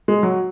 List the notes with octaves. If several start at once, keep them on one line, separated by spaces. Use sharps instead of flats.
G#3
F#3